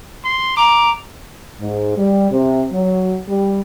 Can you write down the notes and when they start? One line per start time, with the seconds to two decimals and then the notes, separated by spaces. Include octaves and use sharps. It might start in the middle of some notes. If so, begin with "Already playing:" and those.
0.24 C6
0.57 A#5 D6
1.61 G#2
1.97 G3
2.31 C3
2.73 F#3
3.28 G3